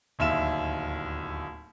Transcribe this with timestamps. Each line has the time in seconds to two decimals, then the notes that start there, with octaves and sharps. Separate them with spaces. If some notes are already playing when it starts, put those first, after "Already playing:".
0.19 D1 D#2 E5 E7